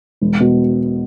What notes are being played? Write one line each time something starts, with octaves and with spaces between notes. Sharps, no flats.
E1
B2